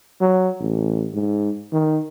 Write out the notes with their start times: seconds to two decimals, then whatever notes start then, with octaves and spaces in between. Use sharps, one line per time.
0.21 F#3
0.60 A1
1.13 G#2
1.72 D#3